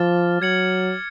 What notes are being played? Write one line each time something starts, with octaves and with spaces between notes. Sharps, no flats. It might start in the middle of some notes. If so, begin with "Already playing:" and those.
Already playing: F3 D6 F6 A6
F#3 G#6 C#7 F#7